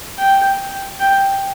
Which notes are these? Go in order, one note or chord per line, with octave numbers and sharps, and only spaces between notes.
G5
G5